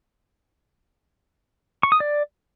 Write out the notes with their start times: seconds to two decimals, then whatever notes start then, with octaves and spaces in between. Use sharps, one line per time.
1.83 C#6
1.92 D#6
2.00 D5